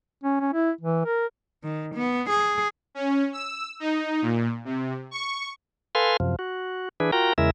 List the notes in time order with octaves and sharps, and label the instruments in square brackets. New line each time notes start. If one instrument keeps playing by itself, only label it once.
[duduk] C#4
C#4
E4
E3
A#4
[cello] D#3
B3
G#4
[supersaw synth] C#4
E6
D#4
A#2
C3
C#6
[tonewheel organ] A4 B4 F5 G#5 C6
F#2 C3 F3
F#4
E3 D4 G#4 B4
F4 F#4 A#4 G5 A#5
E2 C#3 G#3 E4 A#4 E5